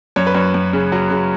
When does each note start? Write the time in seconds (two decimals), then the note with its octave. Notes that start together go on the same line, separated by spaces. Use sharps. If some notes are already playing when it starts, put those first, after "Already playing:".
0.16 F#2 C#5
0.27 B4
0.35 F#2 C#5
0.54 F#2
0.73 C#3
0.92 F#3
1.10 C#3